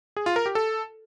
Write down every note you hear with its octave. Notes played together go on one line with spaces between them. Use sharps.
G#4
F4
A#4
G4
A4